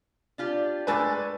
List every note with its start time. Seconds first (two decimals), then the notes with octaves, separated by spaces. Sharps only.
0.38 D4 F4 G4
0.87 G#3 A3 D4 B4 E6 A6